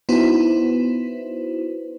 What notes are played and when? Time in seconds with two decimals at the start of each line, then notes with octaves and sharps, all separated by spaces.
0.09 B3 D#4 E4 F#4 B4 C5